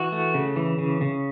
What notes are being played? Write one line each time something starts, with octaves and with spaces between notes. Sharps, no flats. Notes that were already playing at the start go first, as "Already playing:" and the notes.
Already playing: E3 F#4
A3
C#3
E3
C#3
C#3